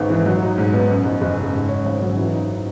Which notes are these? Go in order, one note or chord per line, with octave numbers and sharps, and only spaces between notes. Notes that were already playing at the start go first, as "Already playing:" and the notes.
Already playing: G#1 G#2 B3
E3
F#3
D#4
G#2
B3
F#2
F#1
F#1
C#3
G#2
C#4
G#1
F#3
E3
D#4